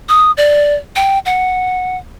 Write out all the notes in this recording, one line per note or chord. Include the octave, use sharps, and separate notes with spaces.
D#6
D5
G5
F#5